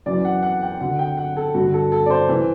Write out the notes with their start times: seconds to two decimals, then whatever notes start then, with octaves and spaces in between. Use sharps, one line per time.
0.06 F#2 E3 D5
0.25 F#5
0.43 F#5
0.62 G5
0.81 D2 D3 F#5
0.99 G5
1.17 F#5
1.37 A4
1.54 G2 F#4
1.60 D3
1.74 A4
1.92 A4
2.06 D5
2.10 C5
2.29 E3